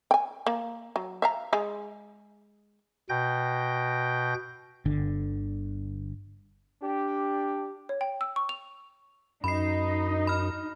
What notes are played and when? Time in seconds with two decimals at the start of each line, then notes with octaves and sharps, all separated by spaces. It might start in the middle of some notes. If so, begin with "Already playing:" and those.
0.11 G5 G#5
0.46 A#3
0.96 F#3
1.22 E5 F5 A#5
1.53 G#3 G#4
3.09 B2 G5 G6 A#6
4.85 G1 D3
6.82 D4 G4
7.89 C#5
8.01 G5
8.21 E6
8.36 C#6
8.49 F7
9.44 F#2 D#4 B5 C7
10.27 B5 F6